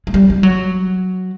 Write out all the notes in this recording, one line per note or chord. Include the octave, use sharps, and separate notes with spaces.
G#3
G3
G3
F#3